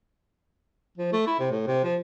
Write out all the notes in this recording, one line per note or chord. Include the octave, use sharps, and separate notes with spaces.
F3
A3
E4
C3
A2
C3
F3